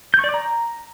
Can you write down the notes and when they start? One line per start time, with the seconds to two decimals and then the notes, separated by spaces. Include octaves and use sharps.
0.14 G6
0.19 C#6
0.24 D5
0.29 D6
0.34 A#5